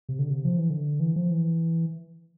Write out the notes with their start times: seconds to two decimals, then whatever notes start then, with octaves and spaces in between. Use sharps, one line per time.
0.09 C3
0.19 D3
0.30 C3
0.45 F3
0.57 E3
0.70 D3
1.00 E3
1.16 F3
1.30 E3